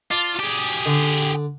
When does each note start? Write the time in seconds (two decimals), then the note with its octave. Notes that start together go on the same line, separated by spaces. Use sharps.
0.11 F4 D5 A5
0.40 G4 G#4
0.86 D3